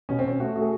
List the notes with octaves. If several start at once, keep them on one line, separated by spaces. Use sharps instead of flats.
B2 C#4
C4
B2 C#4
A3 F#4
A3
G#4